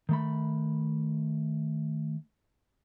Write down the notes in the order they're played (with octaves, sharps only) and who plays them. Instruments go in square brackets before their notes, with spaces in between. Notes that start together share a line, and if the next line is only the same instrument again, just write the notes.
[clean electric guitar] D#3 A3 B5